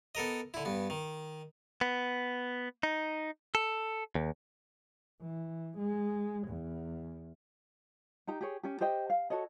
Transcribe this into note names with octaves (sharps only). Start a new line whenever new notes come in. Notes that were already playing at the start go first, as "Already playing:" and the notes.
B3 A4 A#4 D#5
D3 E4
G2 B3
D#3
B3
D#4
A4
D#2
E3
G#3
E2
D#4 G4 A#5
G4 G#4 C#5
C#4 G4
G4 C5 D#5 G5
F5
F#4 A4 C#5 D#5